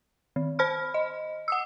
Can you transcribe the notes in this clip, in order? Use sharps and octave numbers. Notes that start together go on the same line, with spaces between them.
D#3
C5 B5 F6
D#5
F#5 D#6 E6